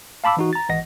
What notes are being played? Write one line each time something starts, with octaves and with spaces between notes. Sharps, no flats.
F5 A5 B5 D6 E6
E3 D#4 F#4
A#5 A6
G#1 E3 D#5 F#5 A#6